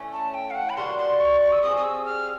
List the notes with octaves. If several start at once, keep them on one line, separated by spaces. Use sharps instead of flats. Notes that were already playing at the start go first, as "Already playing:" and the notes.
Already playing: E3 A3 C#4
A5
G5
F5
F#5
B5
G3 A#3 D4 F#4 C6
C6
C#6
C#6
E6
G3 C4 F4 G#4 D#6
D#6
E6
F6